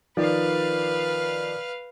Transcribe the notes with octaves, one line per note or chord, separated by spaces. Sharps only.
D#3 F3 B4 D5 F5